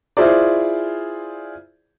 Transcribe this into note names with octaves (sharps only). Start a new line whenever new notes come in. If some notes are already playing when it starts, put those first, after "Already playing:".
E4 F4 G#4 C5 D5